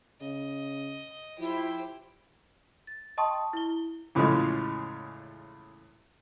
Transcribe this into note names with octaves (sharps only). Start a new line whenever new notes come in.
C#3 D#5
F3 E4 G4 C5
A6
D#5 G5 A5 C6 C#6 D#6
E4 G7
E2 A2 C#3 F3 G#3